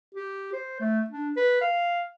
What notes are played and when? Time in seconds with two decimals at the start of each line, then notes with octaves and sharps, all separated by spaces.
0.15 G4
0.53 C5
0.80 A3
1.10 D4
1.37 B4
1.62 F5